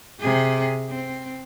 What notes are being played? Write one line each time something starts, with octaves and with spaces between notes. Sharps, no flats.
C3 G#4
C4